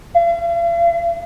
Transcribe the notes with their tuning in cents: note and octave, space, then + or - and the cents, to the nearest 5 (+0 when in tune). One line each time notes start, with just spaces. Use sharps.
F5 -45